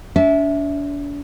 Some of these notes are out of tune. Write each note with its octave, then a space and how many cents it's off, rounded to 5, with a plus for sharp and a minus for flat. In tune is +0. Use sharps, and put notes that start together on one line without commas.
D4 -40 E5 -10